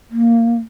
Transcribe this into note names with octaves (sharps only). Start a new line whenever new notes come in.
A#3